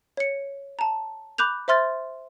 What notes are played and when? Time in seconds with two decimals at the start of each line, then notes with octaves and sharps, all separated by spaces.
0.17 C#5 C#7
0.79 A5 A#5
1.38 B5 D6 F#6 G6 F7
1.68 C5 E5 C6 F6 A6